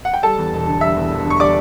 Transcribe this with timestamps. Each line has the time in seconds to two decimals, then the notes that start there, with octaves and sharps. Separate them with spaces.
0.05 F#5
0.14 G5
0.23 G3 A4 A5
0.38 E2
0.53 E1
0.67 D3
0.81 G3 E5 E6
0.96 E2
1.11 E1
1.25 D3
1.30 C#6
1.40 G3 D5 D6